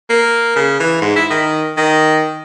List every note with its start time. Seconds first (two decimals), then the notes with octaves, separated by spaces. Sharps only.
0.10 A#3
0.56 C#3
0.80 E3
1.02 G#2
1.16 E4
1.30 D#3
1.77 D#3